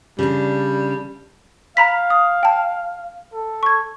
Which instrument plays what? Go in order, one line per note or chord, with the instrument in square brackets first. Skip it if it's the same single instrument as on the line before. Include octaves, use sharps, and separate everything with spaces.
[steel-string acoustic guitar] C#3 D4 [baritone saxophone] G3
[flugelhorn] F5 [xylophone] A#5 B5 B6
[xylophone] D#6
G5 A5
[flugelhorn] A4
[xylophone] C#6 G#6